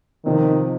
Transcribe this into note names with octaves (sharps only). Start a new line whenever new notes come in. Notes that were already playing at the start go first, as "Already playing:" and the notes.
C3 D#3 F3 C4